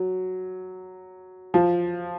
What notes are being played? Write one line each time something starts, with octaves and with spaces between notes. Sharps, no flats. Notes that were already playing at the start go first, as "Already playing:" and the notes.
Already playing: F#3
F3